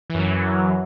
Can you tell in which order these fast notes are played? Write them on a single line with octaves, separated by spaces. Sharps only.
E3 F#2 F#3